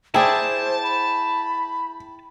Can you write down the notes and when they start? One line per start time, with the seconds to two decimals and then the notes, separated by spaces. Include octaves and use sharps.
0.14 E4 G#4 C5 D5 G5 A5
0.83 B5